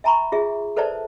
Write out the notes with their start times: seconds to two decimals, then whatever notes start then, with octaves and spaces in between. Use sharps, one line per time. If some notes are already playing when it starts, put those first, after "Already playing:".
0.04 E5 G#5 A#5 B5 C#6
0.32 F4 G#4 E5
0.76 A4 B4 C5 D5 E5 A5